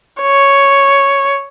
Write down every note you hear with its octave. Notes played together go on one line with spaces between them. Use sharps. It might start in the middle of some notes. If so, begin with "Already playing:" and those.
C#5